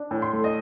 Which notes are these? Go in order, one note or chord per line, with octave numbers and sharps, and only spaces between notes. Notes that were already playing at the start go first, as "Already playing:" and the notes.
Already playing: D4
A2
C6
A3
D#5